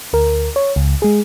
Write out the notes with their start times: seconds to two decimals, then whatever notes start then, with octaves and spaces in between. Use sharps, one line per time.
0.13 D2 A#4
0.56 C#5
0.76 C#2
1.02 G#3 G#4